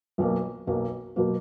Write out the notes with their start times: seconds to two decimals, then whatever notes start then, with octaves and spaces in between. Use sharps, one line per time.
0.18 B1 B2 F#3 A#3
0.67 B1 B2 F#3 A#3
1.16 B2 F#3 A#3